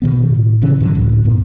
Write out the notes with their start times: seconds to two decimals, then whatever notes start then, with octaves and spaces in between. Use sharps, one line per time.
0.02 B2 D#3 B3
0.30 A2
0.62 C#3 E3 C#4
0.80 G#2 D3 E3 F#3
0.95 C#2 A2
1.25 G2 A#2 B3